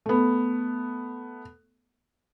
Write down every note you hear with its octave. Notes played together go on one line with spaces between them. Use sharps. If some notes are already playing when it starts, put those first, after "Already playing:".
A3 B3